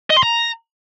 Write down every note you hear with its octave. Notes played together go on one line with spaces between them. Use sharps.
D#5
C6
A#5